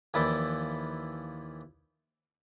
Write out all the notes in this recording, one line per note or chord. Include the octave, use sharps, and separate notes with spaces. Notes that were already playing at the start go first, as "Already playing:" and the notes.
D#2 E3 F3 E4 D5